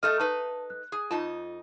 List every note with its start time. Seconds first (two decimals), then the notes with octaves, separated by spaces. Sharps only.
0.03 A3 A4 D#5 F6
0.19 D#4 B4 A5
0.70 F#6
0.92 G#4
1.11 F2 D#4 F4 A5